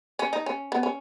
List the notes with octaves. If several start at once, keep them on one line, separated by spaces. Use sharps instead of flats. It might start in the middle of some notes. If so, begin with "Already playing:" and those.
C#4
D#4
C#4
B3
C#4